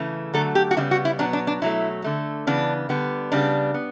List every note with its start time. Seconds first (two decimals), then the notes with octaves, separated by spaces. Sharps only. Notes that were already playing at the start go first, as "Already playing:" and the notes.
Already playing: C#3 E3 A3
0.34 D3 F#3 A3 A4
0.55 G4
0.71 F#4
0.77 C#3 G3 B3 E4
0.91 F#4
1.05 E4
1.19 B2 F#3 B3 D4
1.33 D4
1.47 D4
1.62 B2 F#3 A3 E4
2.04 D3 A3
2.47 C#3 E3 B3 D4
2.89 D3 G3 B3
3.32 C#3 G3 B3 D4
3.74 B3